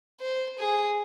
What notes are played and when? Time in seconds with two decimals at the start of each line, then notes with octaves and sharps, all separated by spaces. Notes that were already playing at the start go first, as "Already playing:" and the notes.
0.21 C5
0.59 G#4